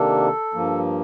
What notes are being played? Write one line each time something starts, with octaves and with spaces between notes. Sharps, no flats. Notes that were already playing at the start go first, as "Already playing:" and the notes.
Already playing: C3 D#3 A#3 D4 A4
G2 F3 A#3